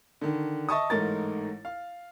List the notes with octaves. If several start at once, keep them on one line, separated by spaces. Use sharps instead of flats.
D3 D#3
D#5 E5 A5 C#6 D#6
A1 G#2 A3 D#4 A#4 A6
F5